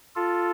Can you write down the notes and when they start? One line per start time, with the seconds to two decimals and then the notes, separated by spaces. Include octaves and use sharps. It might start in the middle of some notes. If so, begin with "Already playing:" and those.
0.16 F4 A4